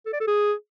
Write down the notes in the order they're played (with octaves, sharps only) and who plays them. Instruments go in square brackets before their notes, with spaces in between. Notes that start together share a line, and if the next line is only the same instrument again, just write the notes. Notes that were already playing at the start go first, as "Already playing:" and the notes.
[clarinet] A4
D5
A4
G#4